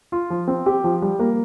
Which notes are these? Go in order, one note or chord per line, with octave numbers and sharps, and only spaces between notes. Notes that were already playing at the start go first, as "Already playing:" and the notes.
F4
F3
C4
G4
F3
G3
A#3